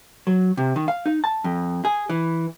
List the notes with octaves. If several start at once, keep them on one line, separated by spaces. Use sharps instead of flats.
F#3
C3
D#3
F5
D#4
A5
F2
G#4
E3